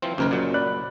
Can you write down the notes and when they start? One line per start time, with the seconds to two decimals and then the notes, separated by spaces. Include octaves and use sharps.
0.02 E3 F3 C4
0.18 F#1 D#2 A#4 B4
0.31 A#2 F#3
0.54 D5 B5 F#6